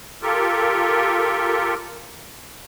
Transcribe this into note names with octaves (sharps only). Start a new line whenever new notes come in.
F4 G4 A4 A#4